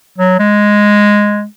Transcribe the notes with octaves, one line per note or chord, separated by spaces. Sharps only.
F#3
G#3